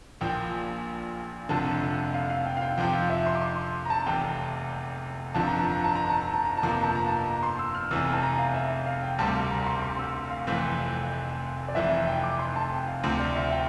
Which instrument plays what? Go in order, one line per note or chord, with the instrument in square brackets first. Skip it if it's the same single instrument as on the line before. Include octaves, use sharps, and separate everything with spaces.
[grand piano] A#1 A#2 F3 [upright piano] G5
[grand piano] F1 F2 D3 [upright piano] A5
[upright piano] F5
F5
G5
F5
G5
[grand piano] F2 C3 F3 [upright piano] G5
[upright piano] G5
F5
E5
C6
D6
C6
A#5
A5
[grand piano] F1 E2 C3 [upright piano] G5
[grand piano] G1 F2 D3 F3 [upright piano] A5
[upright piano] A#5
A5
A#5
A5
A#5
A5
A#5
A5
A#5
A5
[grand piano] G1 F2 C3 F3 A#3
[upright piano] A#5
A5
A#5
A5
A#5
C6
E6
F6
[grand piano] F1 E2 E3 [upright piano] E6
[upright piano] A5
A#5
F5
E5
F5
G5
[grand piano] E1 D2 C3 G3 C4 [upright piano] A5
[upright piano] A#5
C6
C6
E6
F5
[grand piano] F1 F2 E3 A3 C4
[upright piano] D5
[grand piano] F1 F2 E3 [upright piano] E5
[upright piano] G5
D6
C6
A5
G5
F5
[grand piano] D2 C3 F3 C4
[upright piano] D5
E5
G5